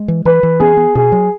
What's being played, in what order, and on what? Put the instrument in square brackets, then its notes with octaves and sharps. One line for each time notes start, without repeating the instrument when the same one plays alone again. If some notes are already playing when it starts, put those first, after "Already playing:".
Already playing: [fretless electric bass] G#3
E3
[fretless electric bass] E3 [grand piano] B4
[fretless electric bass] E3
[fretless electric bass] B3 [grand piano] G#4
[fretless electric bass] B3
[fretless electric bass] B2 [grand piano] G#4
[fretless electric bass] F#3